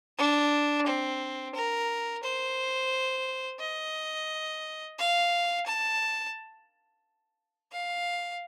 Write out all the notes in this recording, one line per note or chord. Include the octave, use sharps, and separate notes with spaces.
D4
C4
A#4
C5
D#5
F5
A5
F5